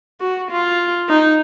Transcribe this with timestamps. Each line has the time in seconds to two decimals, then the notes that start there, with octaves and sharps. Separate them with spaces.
0.20 F#4
0.51 F4
1.09 D#4